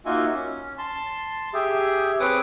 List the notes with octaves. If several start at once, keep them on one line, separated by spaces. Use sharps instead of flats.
A#3 D#4 F4 F#4 E5 G#5
C#4
A5 C6
G4 G#4 E5
C4 G#4 B4 C#5 D6 D#6